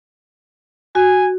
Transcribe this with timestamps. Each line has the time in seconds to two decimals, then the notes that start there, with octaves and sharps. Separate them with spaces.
0.95 F#4 G#5